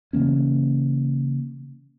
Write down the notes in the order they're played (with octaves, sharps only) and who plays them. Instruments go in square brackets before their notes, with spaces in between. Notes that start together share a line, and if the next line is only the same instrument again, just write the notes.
[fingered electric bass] C#3 E3 A#3 C#4